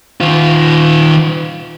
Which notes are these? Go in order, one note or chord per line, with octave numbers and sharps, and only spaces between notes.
D#3 F4